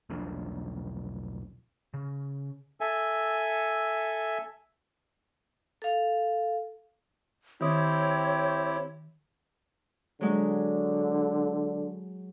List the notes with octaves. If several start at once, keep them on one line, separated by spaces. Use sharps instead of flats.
E1 B1 F3 D4
C#3
A4 E5 G#5
A4 F5
D#3 C4 E4 G4 C#5 D#6
D3 F#3 G#3